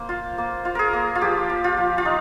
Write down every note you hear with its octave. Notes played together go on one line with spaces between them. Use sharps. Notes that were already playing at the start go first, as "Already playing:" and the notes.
Already playing: A#3 C5
F4
A#3
F4
G#4 A#4
A#3
F4
F3 G4
F3
F4
F3
F4
D#4